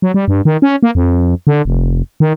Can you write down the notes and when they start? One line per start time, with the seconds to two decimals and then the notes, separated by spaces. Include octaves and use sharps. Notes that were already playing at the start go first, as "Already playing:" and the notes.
0.02 F#3
0.14 G3
0.28 G2
0.45 D#3
0.62 C#4
0.83 A#3
0.95 F2
1.47 D3
1.65 F1
2.20 D#3